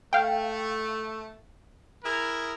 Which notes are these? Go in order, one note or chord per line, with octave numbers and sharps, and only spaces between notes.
A3 F5 G5
E4 G#4 A#4